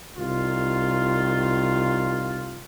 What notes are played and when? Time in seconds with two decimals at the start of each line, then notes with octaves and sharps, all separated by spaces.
0.16 C2 D#3 F4